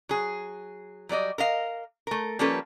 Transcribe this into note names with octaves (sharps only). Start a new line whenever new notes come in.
F#3 G#4
F#3 G3 D5 D#5
A#4 D#5 F5
A3 A#4
F3 G3 A#3 C#4 A4 B4